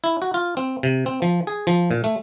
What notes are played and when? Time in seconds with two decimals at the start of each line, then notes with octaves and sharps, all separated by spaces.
0.04 E4
0.22 F#4
0.34 F4
0.57 C4
0.83 C3
1.06 C4
1.22 F3
1.47 G#4
1.67 F3
1.91 A#2
2.04 A3